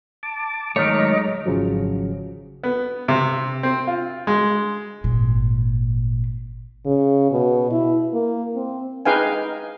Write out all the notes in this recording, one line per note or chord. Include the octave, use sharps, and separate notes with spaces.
A5 D6
D#3 F#3 G#3 A3 C#5 D#5 A#5 D6
G#1 C#3 F3 F#3
B3
C3
C4
F4
G#3
G#1 A#2
C#3
B2
E4
A#3
C4
D#4 G#4 B4 F5 G5 G#5